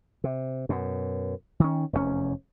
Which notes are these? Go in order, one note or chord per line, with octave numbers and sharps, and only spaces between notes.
C3
F#2 B2
D#3 C#4
F1 E2 A#2 C#4